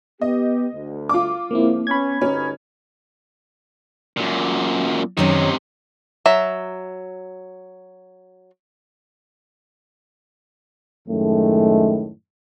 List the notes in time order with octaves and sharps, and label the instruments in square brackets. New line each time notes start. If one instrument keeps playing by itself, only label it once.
[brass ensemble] B3 G4 [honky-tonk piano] D#5
[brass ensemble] D2
[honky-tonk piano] F4 D6
[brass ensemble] C#2 F3 [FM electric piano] A#3 C4 E4
[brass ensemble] B3 C#4 [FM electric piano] B5 G#6
[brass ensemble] D2 G2 D#4 [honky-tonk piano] C#4
[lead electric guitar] F#2 A#2
[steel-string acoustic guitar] F#2 D#3 C#5 [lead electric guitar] C3 D#4
[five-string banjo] F#3 E5
[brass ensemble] F#2 A2 D#3 G#3 A3